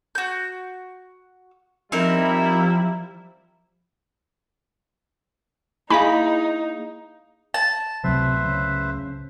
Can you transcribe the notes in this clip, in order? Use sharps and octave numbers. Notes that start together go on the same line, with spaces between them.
F#4 G6
F3 G3 C4 D#4 E4 A#4
A#3 D#4 E4 G#4 F5 G#5 B5
A5
C#2 A2 C3 F#3 B4 C5 E5
C#3